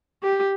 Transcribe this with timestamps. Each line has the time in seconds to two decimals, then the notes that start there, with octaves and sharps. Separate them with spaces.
0.23 G4